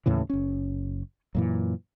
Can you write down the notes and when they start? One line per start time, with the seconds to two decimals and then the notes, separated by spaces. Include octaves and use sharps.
0.06 D#2 A2 C#3 E3
0.30 F#1 C#4
1.35 F#2 A#2 E3